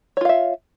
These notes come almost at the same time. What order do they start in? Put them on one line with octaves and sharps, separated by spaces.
C#5 F4 F5 E5